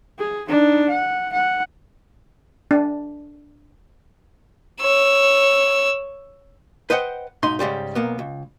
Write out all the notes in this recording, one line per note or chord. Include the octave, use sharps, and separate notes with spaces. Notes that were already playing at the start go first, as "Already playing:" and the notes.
G#4
D4 D#4
F#5
F#5
D4
C#5 E6
B4 C5 D#5 F#5 G5
B1 G#2 D#4 C6
G#2 C#3 G3 C5
B1 A#3 B3
C#2